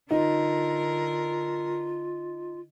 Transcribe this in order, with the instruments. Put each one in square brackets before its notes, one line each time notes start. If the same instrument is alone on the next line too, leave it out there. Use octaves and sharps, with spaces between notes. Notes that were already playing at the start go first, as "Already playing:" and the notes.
[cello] D3 A#4 [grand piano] D#4 [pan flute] F4